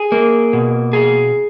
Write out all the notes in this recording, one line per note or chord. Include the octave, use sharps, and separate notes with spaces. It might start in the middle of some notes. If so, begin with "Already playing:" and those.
Already playing: G#4
A#3
B2
G#4